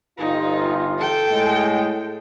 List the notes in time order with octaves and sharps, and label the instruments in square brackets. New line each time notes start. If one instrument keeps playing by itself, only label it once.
[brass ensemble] G1 F4 [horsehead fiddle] D#4
[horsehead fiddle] A4 G5
[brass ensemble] A2 G#3